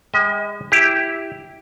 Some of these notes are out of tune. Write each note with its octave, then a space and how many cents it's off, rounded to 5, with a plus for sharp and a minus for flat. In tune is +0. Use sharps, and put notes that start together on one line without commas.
G#3 -30 D#5 +35 G5 -10
E4 +0 G4 +0